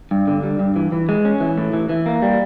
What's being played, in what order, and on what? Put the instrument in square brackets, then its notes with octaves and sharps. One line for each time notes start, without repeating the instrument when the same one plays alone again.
[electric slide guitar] G2
D3
G3
G2
E3
E3
G#3
C#4
E3
A2
E3
E3
A#3
G3